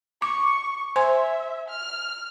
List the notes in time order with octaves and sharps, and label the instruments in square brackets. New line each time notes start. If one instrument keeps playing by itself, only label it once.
[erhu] C#6 [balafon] D6
[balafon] C5 G#5 C6 [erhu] E5
[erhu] F6